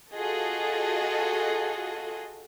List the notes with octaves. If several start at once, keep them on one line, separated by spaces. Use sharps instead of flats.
F4 F#4 G#4 A4 D#5